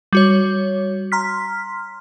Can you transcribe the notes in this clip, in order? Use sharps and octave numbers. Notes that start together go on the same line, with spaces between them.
G3 F#4 C#5
A#5 C6 F6 B6